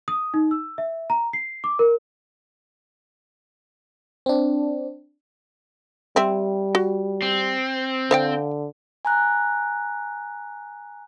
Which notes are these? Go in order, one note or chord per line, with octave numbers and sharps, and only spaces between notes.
D#6
D#4
E6
E5
A#5
C7
D6
A#4
C4 D4
G3 C4 E5
F#4
C4
D3 C5 F5 G5
G#5 A#5 F#6